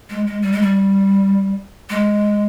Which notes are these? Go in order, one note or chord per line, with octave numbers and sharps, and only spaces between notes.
G#3
G#3
G3
G#3
G3
G#3